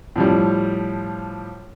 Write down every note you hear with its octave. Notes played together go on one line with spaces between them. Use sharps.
A2 F3 G3